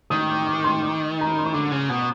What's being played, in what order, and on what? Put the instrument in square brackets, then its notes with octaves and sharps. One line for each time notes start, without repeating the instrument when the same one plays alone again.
[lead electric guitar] D#3 [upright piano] D#6
[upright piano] D6
D6
C6
D6
A#5
B5
C6
C#6
[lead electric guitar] D3 [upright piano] D6
[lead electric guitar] C#3
B2